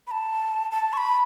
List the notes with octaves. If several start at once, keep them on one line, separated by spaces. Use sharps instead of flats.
B5
A5
A5
C#6
B5